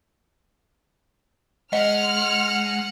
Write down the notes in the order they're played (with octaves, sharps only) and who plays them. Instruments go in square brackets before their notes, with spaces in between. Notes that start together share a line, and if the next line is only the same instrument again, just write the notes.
[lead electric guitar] G#3 [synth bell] D#5 [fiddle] F#5 [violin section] F6